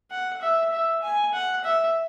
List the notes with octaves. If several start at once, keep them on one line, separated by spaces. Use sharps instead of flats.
F#5
E5
E5
G#5
F#5
E5